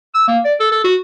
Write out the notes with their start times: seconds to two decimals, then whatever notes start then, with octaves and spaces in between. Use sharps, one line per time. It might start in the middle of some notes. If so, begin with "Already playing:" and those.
0.15 E6
0.27 A#3
0.45 D5
0.60 A4
0.72 A4
0.84 F#4